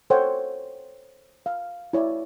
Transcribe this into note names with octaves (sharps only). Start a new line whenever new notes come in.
A4 C5 C#5 F#5 G5
F5
E4 C#5 D5